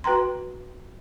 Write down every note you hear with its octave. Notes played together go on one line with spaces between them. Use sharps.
F#4 B4 G5 A#5 C6